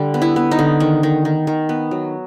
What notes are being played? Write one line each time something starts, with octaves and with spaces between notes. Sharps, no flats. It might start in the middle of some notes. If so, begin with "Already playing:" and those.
Already playing: D3 G3
B3
E4
B3
D#4
D3
D#3
D#3
D#3
D#3
B3
F#3